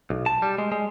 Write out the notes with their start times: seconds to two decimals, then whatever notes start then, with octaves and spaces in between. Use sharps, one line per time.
0.10 B1
0.26 A5
0.42 G3
0.58 G#3
0.72 G#3